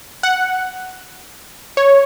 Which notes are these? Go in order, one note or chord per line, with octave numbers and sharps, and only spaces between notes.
F#5
C#5